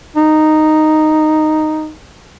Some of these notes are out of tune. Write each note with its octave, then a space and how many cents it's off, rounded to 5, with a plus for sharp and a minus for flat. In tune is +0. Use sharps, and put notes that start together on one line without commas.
D#4 -5